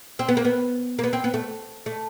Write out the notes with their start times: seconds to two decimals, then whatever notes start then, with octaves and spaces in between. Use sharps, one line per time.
0.19 C4
0.28 B3
0.37 A#3
0.45 B3
0.99 A#3
1.04 B3
1.13 C4
1.24 B3
1.34 A3
1.86 A3